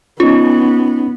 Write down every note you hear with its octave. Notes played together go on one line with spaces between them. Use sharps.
B3 C#4 D#4 F4